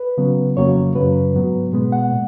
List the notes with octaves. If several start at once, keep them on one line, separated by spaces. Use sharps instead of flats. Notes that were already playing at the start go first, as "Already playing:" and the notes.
Already playing: B4
C#3 F#3 B3
F2 C#3 F#3 A#3 C#5
F#2 C#3 F#3 B4
G#2 F#3 B3
B2 G#3 B3
F#5
A#2